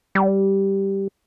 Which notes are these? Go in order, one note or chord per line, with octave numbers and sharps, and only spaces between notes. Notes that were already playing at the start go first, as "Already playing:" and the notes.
G3